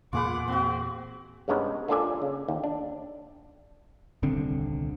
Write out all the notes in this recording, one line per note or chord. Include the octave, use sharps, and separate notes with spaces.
E2 A#2 A#3 F4 G#4 B4 F#5 D6
C4 F#4 F#5
G2 C3 G#3 B3 C#4 D#4
A#3 D4 F4 A4 D5 G#5
C#3
D#2
D4
D#1 C2 D3 C4